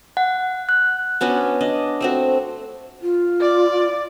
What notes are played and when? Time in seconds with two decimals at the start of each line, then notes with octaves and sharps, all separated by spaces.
0.17 F#5
0.69 F#6
1.21 B3 C#4 D4 F#4
1.61 D4 D#5
2.01 A3 C4 F#4
3.02 F4
3.41 D5